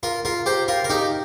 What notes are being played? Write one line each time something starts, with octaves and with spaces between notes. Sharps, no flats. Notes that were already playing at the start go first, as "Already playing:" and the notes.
F4 A#4
F4 A#4
G4 C5
F4 A#4
A#4
D#4 G4